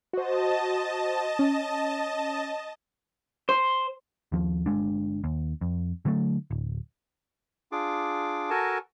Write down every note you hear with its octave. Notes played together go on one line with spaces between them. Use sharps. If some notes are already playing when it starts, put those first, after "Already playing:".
F#4 C5 D#5 A5
C#4
C5
D#2 F3
G1 D#2 G#3 D4
D#2
F2
D3 F#3 G3 A3
D1
D4 F4 G#4 D6
F#4 A4 A#4 G#5 A5